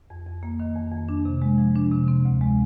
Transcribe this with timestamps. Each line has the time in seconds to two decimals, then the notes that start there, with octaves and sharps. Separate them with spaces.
0.10 F2
0.26 F2
0.43 A#3
0.60 D#3
0.75 F2
0.92 F2
1.09 D4
1.25 C3
1.42 G#3
1.58 F3
1.75 D4
1.91 C3
2.08 C4
2.25 D2
2.41 G#3